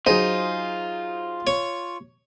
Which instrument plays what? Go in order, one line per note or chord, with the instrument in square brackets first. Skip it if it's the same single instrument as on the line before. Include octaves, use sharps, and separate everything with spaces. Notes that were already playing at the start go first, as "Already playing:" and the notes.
[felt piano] F#3 G#4 C5 [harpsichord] D#4 [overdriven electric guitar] F4
[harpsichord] C#5